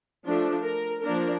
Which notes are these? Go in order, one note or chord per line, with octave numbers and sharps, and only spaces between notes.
F3 A3 D4
A#4
F3 A#3 D4 A#4